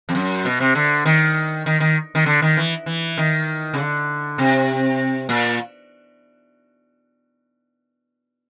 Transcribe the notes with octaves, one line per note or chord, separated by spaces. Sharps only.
F2
F#2
B2
C3
D3
D#3
D#3
D#3
D#3
D3
D#3
E3
E3
D#3
C#3
D3
C3
A#2